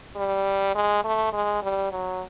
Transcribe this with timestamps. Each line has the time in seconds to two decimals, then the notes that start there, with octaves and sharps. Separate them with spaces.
0.16 G3
0.75 G#3
1.05 A3
1.33 G#3
1.63 G3
1.92 F#3